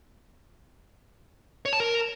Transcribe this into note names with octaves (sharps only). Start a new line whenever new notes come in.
C#5
A5
A#4